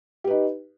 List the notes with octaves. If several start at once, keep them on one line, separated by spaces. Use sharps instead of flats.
D#4 G4 B4